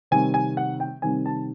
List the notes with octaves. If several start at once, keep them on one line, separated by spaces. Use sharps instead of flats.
C3 D#3 G3 C4 G#5
G#5
F#5
G5
C3 D#3 G3 C4 G#5
A5